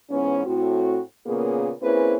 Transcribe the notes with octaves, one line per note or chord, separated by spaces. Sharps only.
G#2 E3 B3 C#4
A2 C4 F#4
A#2 C#3 A#3 B3 C#4 G#4
A#3 C4 C#4 E4 G#4 B4